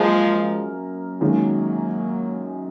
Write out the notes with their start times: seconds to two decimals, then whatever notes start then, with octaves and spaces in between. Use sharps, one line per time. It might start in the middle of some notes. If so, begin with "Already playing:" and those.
Already playing: F#2 F3 G#3 A#3 A#4
1.21 F#2 D#3 F#3 G#3 A#3 D#4 G#4